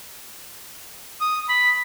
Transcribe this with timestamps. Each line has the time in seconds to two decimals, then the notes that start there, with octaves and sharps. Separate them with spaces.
1.21 D#6
1.49 B5